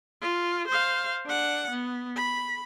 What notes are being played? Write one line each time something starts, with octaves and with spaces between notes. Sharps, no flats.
F4
C5 F5
D4 F#5
B3
B5